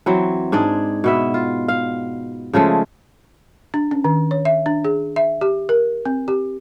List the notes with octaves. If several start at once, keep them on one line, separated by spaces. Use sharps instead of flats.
E3 F#3 C4
G#2 D4 G#4 D5
B2 B3 E5
F4
F5
C#3 F3 G#3 A3
D4
C#4
D#3
C#5
E5
D4
G#4
E5
G4
A#4
C4
G4